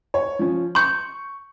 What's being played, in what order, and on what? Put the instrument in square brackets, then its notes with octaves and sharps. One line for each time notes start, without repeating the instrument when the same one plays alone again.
[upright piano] C#5
F3 C#4
[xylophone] C6 G6 [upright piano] C#6